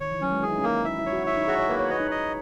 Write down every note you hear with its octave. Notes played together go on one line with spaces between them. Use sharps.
D#3 C#5
E3
F#3 C#4
G#3
E4 G#4
D#4
C#4
A#3 D#4
E4 E5
E4
C#5
F#4
E4 E5
D#4
F#4 G#4
C#5
A#3 B4
C#5
B4 D#5
D#4
D#5